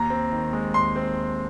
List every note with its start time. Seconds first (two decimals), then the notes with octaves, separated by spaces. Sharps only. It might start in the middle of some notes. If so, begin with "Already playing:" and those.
Already playing: D#2 A#5
0.10 C4
0.32 D#3
0.53 G#3
0.74 D#2 C6
0.96 C4